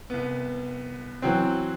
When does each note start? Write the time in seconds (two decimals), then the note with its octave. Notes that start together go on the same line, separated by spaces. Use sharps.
0.10 C2 B3
1.22 E3 F#3 C4